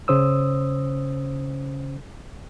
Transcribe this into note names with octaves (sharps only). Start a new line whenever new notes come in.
C#3 C#4 C5 D#6 E6